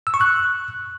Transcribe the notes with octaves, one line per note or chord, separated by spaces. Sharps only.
E6
C#6
F#6